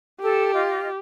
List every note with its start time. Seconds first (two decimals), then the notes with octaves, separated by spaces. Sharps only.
0.21 G4 A4
0.53 F4 D#5